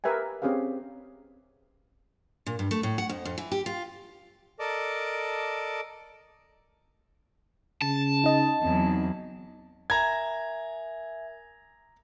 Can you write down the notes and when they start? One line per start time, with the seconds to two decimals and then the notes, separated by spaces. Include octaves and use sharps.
0.04 G4 A#4 B4 E5 G5 G#5
0.42 C4 C#4 G4 G#4 B4 F5
2.47 A#2
2.59 G2
2.71 A3
2.83 A2
2.98 F#5
3.09 F2
3.25 F2
3.38 E3
3.52 G4
3.66 F4
4.60 A4 A#4 D5 D#5 A5 D6
7.82 C#3 A5
8.24 D#4 D#5
8.62 E2 F#3 C4
9.90 A#4 E5 G#5 A#5 G#6